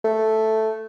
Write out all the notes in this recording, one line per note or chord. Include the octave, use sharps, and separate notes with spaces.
A3